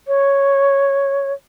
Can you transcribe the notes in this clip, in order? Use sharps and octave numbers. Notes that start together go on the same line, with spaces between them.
C#5